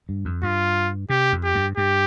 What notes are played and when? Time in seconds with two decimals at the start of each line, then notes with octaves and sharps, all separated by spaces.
0.09 G2
0.25 F2
0.43 G2 F4
1.09 C3 G4
1.32 F2
1.43 G4
1.55 G2
1.77 G2 G4